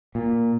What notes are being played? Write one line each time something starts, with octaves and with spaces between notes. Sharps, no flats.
A#2